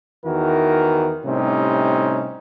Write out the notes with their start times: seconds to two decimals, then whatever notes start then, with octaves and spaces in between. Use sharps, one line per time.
0.25 E2 D#3 E3 F#4 A#4
1.25 A2 C3 G3 C#4 D#4